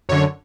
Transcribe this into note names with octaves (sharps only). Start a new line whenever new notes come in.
F#2 D3 C#5